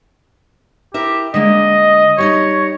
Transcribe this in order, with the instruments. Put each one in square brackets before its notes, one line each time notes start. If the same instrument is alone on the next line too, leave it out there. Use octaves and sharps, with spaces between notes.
[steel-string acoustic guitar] E4 A#4 E5 [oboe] G4
[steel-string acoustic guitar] D3 G#3 A#3 [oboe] D#5
[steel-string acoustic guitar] G3 D#4 D#5 [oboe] C#5